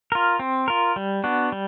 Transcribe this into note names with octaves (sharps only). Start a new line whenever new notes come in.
F4 A#4
C4
F4 A#4
G3
B3 D4 F#4
G3